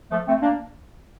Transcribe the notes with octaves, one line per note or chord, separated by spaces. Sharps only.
F3 A3
A3 C4
A#3 D4